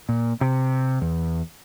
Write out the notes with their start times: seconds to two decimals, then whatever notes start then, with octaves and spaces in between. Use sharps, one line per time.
0.09 A#2
0.41 C3
1.02 E2